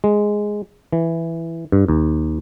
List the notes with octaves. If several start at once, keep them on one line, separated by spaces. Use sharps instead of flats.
G#3
E3
G2
D#2